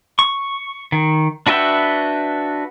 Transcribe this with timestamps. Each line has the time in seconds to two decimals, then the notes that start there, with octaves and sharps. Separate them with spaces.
0.19 C#6
0.92 D#3
1.47 D4 F#4 B4 E5 G5